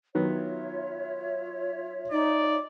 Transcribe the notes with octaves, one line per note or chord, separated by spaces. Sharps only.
D#3 F#3 B3 F4 C#5 E5
D#4 D5